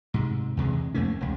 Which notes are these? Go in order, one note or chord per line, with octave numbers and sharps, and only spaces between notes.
G#2 C3
E2 C3 E3 G#3
F2 A3 A#3 C#4
E1 C#2